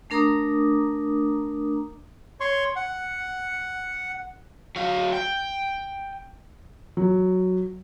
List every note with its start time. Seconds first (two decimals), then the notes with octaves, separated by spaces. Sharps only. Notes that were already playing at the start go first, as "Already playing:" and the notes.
0.10 A3 D4 A#4 A#5 D6 D#6
2.40 C#5 C6 C#6
2.76 F#5
4.76 F#3 F5
5.13 G5
6.97 F#3